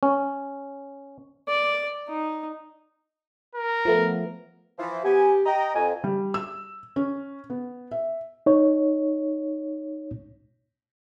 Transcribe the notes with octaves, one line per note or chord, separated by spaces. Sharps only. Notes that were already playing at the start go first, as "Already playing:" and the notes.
C#4
D5
D#4
A#4
F3 A3 B3
E3 F3
B3 G4 G#5
D#5 G5 A#5
F2 G#5
G3
E6
C#4
B3
E5
D#4 C#5